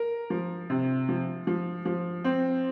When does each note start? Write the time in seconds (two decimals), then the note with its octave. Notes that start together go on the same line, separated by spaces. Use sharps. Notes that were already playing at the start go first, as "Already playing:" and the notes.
Already playing: A#4
0.30 F3
0.70 C3
1.09 F3
1.47 F3
1.85 F3
2.24 C4